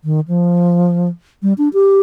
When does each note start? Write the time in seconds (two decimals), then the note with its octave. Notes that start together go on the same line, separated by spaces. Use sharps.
0.04 D#3
0.28 F3
1.43 G3
1.58 D4
1.73 G4